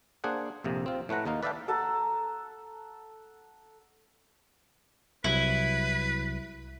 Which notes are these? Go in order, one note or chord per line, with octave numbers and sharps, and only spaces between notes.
A#3 D4 G#4 C5 F#5
A#1 F2 C3 A#3
C4 F4
A2 A3 B4 F#5 A#5
D#2 A#3 D#4 F5
B4 D5 E5 F5 G5 A5
A4 F#5 A5 A#5
C2 C3 F#3 E4 B4